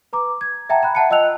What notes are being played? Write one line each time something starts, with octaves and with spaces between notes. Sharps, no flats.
B4 A#5 D6
G#6
E5 F#5 G5 A5 A#5
G5 A#5 B5 F#6
E5 F#5 A5 C#7
F4 D#5 G5 E6 F#6 F7